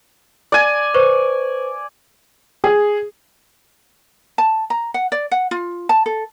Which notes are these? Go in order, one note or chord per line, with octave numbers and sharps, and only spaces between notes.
D5 G#5
B4 C5 C#6
G#4
A5
A#5
F#5
D5
F#5
F4
A5
A4